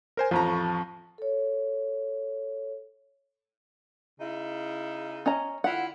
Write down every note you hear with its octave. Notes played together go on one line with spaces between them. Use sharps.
A#4 C5 G#5
A1 F2 F3 A5 A#5 C#6
A4 C#5
C#3 D#4 E4
C#4 D#5 A#5
D3 E4 F4 F#5